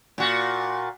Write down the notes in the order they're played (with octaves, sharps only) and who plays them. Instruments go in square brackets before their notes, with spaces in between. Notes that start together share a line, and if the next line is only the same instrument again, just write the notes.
[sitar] A#2 F#4